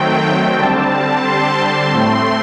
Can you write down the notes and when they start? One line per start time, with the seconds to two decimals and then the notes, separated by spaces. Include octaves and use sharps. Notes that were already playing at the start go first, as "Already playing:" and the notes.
Already playing: D#3 F#3 A3 C4 G5
0.58 D3 G3 C4 A5
1.25 C6
1.92 A2 A3 C4 C6